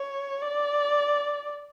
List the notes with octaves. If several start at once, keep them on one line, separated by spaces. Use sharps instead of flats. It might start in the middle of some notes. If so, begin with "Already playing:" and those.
Already playing: C#5
D5